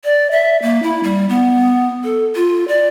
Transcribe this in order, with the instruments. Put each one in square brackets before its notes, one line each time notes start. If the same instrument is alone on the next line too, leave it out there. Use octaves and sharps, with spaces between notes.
[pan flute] D5
E5
A#3
E4
G3
B3
A4
F4
D5